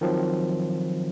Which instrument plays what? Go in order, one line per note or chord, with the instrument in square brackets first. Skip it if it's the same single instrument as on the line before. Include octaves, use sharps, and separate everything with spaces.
[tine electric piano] D#3 F3 F#3 C4